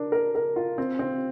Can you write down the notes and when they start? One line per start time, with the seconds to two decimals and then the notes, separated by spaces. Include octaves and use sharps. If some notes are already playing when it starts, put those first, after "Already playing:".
Already playing: D4 A#4
0.12 A#4
0.35 A#4
0.56 F4
0.78 C4
0.99 C4